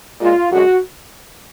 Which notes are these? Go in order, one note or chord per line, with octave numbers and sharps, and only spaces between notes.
A#2 G#3 F4
F#2 D3 G#3 F#4